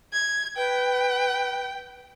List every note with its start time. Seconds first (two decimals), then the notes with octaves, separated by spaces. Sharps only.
0.13 G#6
0.57 B4 G5